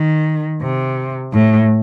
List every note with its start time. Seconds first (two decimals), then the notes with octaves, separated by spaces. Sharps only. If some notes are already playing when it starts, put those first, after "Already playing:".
Already playing: D#3
0.62 C3
1.33 A2